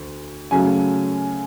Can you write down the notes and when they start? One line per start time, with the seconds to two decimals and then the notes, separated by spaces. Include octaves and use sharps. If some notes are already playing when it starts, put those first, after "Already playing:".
Already playing: D2
0.51 F#2 C#3 F#3 A3 G#5